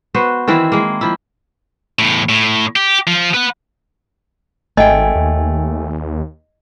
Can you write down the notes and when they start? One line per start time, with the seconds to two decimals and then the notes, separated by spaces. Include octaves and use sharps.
0.14 B3 F#4 C5
0.48 D#3 E3 C4 E4
0.72 G#3 A#3
1.01 F3 E4
1.99 E2 A2
2.29 A2
2.76 G4
3.07 F3
3.34 B4 F#5
4.77 G#1 A3 D#5 G5 G#5
5.15 D#2